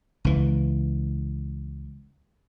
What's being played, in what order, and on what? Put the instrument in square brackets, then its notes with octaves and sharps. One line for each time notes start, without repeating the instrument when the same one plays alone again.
[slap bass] C#2 E3